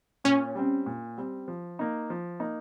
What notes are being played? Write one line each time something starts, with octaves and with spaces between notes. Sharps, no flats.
A#2 C#4
G3 C4
A#2
G3 C4
F3
A#3 D#4
F3
A#3 D#4